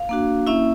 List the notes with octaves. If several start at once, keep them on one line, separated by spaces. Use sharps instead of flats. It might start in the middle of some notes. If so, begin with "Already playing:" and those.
Already playing: F5
A#3 D4 F#4
A#3 C#4 E4 E5